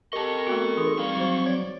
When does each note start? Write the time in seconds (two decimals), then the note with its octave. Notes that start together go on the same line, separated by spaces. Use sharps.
0.13 G4 A4 A#4 D#5 A5 C#6
0.47 A3 B3 F#4
0.77 E3 D#4 G#4
0.98 G3 C4 F5
1.17 F#3 F#4 C5
1.46 C#5 D5